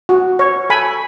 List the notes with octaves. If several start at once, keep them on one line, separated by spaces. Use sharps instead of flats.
F#4
C#5
A4 G#5 B5